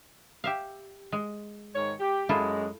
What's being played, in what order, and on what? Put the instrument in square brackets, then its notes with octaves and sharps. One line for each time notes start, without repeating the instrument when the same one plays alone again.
[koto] G4 E5 F5
G#3
[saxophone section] G#2 D#3 C#5
G4
[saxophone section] F#2 G#3 [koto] E4 F4 A4